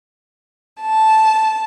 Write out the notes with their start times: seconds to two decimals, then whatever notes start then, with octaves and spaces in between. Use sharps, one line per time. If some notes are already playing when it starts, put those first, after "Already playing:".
0.81 A5